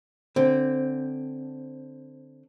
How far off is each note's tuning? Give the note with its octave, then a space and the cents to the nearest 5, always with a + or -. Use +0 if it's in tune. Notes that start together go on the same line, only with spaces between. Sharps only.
D3 +0 C4 +0